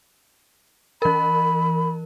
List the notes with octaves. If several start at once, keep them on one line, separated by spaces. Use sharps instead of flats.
E3 A#4 B5